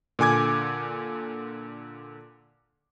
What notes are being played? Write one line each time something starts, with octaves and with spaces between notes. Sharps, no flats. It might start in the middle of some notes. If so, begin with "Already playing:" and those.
A#2 D3 G#5 D6 G#6